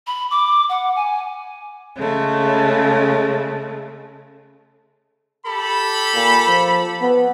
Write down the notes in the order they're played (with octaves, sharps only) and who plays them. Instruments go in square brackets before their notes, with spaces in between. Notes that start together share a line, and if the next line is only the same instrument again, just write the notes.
[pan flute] B5
D6
F#5
G#5
[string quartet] C#3 G#3 A3
[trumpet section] G4 A4 B5
[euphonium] A#2
F3
B3